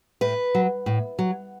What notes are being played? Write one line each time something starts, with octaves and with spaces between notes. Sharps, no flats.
A2 B4
F#3
A2
F#3